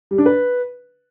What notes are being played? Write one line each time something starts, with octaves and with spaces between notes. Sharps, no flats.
G3
D4
B4